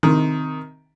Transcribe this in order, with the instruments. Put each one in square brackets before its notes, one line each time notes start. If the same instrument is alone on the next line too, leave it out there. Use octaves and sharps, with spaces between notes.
[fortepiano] C3 D#3